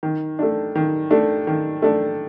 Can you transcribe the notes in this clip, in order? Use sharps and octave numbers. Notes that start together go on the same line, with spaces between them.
D#3
A3 D4
D#3
A3 D4
D#3
A3 D4